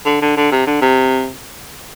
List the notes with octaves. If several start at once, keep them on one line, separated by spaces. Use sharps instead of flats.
D3
D3
D3
C3
D3
C3